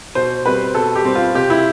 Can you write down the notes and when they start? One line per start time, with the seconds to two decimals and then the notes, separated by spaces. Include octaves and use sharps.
0.15 B2 C5
0.46 G3 C4 B4
0.75 B2 A4
0.95 G4
1.05 G3 C4
1.15 F4
1.35 C3 G4
1.50 E4